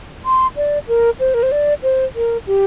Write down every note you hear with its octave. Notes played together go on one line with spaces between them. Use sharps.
C6
D5
A#4
C5
A#4
C5
D5
C5
A#4
G4